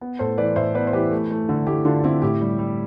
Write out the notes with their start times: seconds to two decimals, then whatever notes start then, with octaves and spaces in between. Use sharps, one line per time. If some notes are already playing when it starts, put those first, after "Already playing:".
0.01 B3
0.19 A2 A4 C5
0.38 E3 B4 D5
0.56 A2 C5 E5
0.74 B3 B4 D5
0.87 C5
0.93 E3 G4 B4
1.11 A3
1.31 A3
1.49 D3
1.66 A3 E4 G4
1.85 D3 D4 F4
2.04 D3 C4 E4
2.22 A2 E4 G4
2.41 G3
2.59 G3